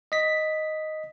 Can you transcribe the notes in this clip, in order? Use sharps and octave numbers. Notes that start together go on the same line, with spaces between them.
D#5 B6